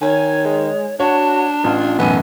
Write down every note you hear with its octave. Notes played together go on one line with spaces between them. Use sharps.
D#3 C#5 G#5
G#3
D4 F#4 C#5 F#5 A5
A1 F4
B1 F#2 A2 E3 B3 G#5